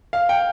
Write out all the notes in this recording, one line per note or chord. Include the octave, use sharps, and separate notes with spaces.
F5
G5